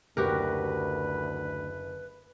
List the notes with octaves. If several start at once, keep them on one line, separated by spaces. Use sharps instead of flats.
F#1 D2 F#4 G4 A#4 B4